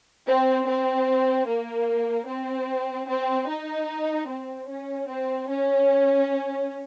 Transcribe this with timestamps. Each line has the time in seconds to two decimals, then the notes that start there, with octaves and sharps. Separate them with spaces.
0.27 C4
0.67 C4
1.47 A#3
2.28 C4
3.09 C4
3.48 D#4
4.28 C4
4.69 C#4
5.08 C4
5.49 C#4